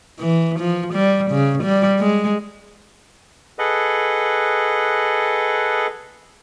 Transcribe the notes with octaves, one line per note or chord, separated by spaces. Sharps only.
E3
F3
G3
C#3
G3
G#3
G#4 A4 B4 D#5 F#5